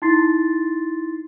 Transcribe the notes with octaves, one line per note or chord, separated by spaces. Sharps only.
D#4 E4 C6 A6 C7